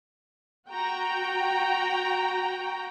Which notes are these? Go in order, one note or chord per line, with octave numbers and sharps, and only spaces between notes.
F#4 G5 A#5